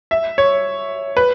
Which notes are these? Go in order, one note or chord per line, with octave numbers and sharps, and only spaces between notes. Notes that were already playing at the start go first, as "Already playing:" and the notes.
E5
C#5
B4